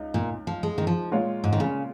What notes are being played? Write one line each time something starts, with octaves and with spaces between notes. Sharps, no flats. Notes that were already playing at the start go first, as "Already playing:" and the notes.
Already playing: C#2 D#4
A#2
F3
G#3
D#3
F3
A#2 G#3 F4 C#5
G#2
D#3
C#3